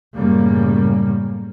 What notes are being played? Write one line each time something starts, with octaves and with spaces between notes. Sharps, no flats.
F#2 A2 C#3 G3 A#3